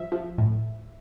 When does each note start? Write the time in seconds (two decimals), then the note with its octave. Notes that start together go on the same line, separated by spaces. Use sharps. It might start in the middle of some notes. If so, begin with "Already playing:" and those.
Already playing: F3 E5
0.12 F3
0.38 A2